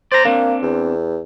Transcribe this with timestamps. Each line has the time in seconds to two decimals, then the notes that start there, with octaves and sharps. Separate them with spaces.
0.12 C5 D5 A#5
0.25 A#3 C4 D4
0.62 E2